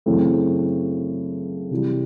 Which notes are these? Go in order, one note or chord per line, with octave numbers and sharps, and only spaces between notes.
F#2 C#3 E3 A3 C4
C3 E3 G3